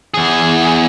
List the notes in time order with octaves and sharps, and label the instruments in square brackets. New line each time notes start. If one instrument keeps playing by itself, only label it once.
[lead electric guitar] E2 G#4